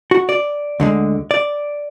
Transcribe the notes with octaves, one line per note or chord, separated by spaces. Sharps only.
F#4
D5
D2 D3 G#3
D5